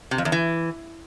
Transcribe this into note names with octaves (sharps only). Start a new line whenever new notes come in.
C3
F2
E2
E3